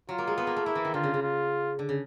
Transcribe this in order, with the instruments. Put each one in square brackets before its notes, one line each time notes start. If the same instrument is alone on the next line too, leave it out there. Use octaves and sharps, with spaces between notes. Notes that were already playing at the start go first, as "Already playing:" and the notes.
[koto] F#3 [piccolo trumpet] F4
[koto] A#3
G#3
B3
A#3
A3
[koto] A#3 [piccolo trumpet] E4
[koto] E3
D#3
[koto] D3 [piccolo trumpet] F4
[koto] C#3
C#3
[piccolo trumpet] F4
[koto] D3
C#3